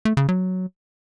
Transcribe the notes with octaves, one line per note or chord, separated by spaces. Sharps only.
A3
C#3
F#3